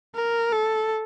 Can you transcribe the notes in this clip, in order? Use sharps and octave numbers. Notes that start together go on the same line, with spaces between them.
A#4
A4